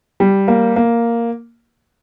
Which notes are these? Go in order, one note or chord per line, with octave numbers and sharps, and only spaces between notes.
G3
A#3
A#3